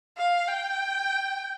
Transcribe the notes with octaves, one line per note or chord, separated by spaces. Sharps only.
F5
G5